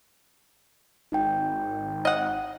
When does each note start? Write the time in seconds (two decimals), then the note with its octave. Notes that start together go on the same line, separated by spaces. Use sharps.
1.12 G#1 D#4 G5
2.05 D#5 F#5